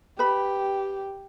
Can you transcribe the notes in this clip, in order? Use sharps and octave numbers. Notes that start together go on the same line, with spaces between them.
G4 B4 B5